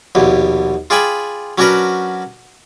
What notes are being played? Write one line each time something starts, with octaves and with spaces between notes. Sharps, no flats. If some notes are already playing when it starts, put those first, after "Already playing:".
A#1 D#2 B2
F4 G#4 D5 G5 G#5 B5
F#3 C#4 D4 F#4 A#4 B4